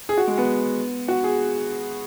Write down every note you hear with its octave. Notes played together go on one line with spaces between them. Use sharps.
G#4
F#4
G#3
B3
F#4
G#4